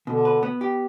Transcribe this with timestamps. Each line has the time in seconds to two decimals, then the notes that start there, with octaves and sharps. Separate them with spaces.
0.07 B2 D3
0.25 B4
0.43 B3
0.61 G4